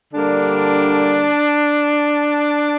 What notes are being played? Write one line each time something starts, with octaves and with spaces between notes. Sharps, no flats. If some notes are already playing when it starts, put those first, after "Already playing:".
D3 G3 A#3 D4